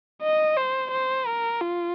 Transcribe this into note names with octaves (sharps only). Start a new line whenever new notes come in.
D#5
C5
C5
A#4
F4